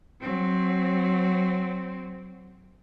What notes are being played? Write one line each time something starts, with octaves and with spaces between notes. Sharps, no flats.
F#3 C4